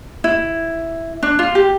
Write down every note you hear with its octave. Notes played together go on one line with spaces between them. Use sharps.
E4
D4
F4
G4